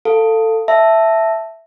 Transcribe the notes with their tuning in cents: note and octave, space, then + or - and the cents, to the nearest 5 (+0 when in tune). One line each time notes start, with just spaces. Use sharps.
A4 +15 F5 +0
E5 +0 A5 +0